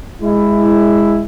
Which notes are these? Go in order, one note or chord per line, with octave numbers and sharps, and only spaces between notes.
G#3 E4